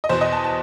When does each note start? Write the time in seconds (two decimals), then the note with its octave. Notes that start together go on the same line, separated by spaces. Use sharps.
0.04 D#5
0.09 E2 B2 C5
0.21 D#5
0.33 A5
0.44 A5